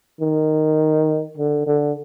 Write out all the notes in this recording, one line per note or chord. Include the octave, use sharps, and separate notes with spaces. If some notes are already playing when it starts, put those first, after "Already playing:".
D#3
D3
D3